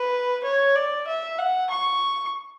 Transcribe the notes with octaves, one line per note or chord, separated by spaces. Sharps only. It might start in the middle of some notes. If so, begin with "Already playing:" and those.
Already playing: B4
C#5
D5
E5
F#5
C#6